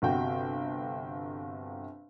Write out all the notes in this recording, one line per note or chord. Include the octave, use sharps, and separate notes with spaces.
G1 C3 F#4 G5